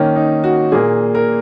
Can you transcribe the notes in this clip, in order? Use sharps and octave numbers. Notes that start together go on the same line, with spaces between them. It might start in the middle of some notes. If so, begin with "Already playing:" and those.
Already playing: D#3 A#3 C#4
D#4
F#4
A#2 A#3 G#4
A#4